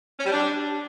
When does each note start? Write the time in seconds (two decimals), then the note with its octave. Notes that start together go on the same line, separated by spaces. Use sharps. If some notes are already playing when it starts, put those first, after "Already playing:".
0.19 C#4
0.25 G3
0.32 D4